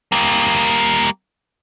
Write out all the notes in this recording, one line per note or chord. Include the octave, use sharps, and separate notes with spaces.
G3 A#3